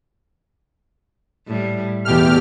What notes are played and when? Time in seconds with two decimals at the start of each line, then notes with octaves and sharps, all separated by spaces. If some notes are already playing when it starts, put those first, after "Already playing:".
1.48 A2 G3
2.05 E2 B2 A3 G4 F6